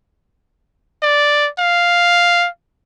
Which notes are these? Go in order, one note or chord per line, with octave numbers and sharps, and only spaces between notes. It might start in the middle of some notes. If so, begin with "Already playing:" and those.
D5
F5